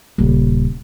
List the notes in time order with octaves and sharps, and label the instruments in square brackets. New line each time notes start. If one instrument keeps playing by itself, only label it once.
[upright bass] D#1 C#3